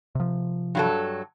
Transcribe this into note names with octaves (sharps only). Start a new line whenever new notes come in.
C3 F3
G2 F#3 A4